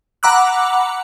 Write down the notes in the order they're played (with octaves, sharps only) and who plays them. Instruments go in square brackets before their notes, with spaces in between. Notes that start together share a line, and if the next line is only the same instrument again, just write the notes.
[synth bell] F#5 A#5 B5 D6 E6 F#6